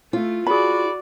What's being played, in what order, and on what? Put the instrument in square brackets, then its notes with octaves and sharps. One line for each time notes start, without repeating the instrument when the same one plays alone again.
[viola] A3 [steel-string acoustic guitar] F4
[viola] F#4 D5 [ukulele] G#4 B5